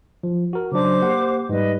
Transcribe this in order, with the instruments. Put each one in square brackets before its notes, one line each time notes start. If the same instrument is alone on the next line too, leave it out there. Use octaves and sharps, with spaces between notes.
[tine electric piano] F3
F#4 A#4
[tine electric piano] C#3 F#3 D4 [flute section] C5 D6
[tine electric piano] A#3 G4 F#5
[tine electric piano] G#2 G3 [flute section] B4 D#5